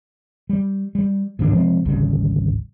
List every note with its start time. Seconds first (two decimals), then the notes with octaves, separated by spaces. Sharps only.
0.49 G3
0.95 G3
1.39 D2 G#2 D3 D4
1.51 C3 F3 G#3 C4
1.85 G#1 D2 C#3 G3